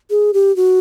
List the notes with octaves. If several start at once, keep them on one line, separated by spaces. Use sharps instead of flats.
G#4
G4
F#4